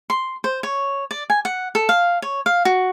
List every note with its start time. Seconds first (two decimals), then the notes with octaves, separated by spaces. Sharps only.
0.10 C6
0.44 C5
0.63 C#5
1.11 D5
1.30 G#5
1.45 F#5
1.75 A4
1.89 F5
2.22 C#5
2.46 F5
2.65 F#4